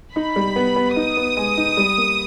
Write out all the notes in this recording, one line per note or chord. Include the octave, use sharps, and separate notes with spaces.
D#4 B5
G3
B3
B3
D#4 D#6
B3
G#3
D#4
G3
A#3